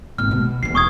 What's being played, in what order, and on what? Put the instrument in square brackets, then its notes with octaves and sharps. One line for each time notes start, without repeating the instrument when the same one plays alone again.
[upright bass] G#1 A#2 [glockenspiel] F6
[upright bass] B2
[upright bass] D#1 E2 [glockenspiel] C7
[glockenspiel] C#6 D#6 G#6